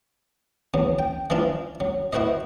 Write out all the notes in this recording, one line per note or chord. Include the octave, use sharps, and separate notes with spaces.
E2 F#3
G5
E3 F3 D4 E4 F4
F#3
E4 F#4 B4 C5 D#5